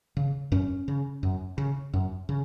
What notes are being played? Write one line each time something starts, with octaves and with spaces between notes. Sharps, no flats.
C#3
F#2 C#4
C#3
F#2
C#3
F#2
C#3